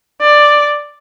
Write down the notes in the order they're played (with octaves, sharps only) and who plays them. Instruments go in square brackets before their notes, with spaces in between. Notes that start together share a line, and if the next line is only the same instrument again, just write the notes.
[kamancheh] D5